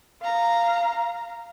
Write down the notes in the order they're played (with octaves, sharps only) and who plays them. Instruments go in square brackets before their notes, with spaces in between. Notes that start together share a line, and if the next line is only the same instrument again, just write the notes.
[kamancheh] F5 A#5